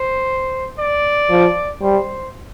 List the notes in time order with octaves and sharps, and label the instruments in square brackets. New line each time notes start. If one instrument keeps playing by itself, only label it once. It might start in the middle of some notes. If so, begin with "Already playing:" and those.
Already playing: [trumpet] C5
D5
[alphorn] F3
[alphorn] G3 [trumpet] C5